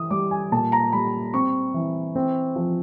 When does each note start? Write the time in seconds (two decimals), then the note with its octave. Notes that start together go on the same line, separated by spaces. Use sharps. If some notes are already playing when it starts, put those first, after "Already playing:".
Already playing: E3 D#6
0.10 G3 D6
0.31 G#5
0.52 A#2 A5
0.72 A#5
0.92 G3 B5
1.34 C4 C#6
1.74 E3
2.15 C4
2.56 F3